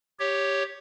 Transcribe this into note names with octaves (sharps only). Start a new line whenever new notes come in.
G4 C#5